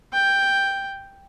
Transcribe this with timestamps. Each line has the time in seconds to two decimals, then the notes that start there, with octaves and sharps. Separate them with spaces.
0.13 G5